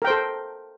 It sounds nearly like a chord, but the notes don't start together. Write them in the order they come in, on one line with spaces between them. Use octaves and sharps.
A#4 G5 C5 A4